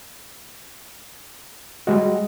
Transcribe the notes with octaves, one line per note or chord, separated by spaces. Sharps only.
G3 G#3 F#4 D#5